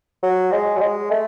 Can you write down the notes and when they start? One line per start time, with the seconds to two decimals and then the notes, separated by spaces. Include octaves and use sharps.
0.23 F#3
0.52 G#3
0.76 F#3
0.81 G#3
1.11 A3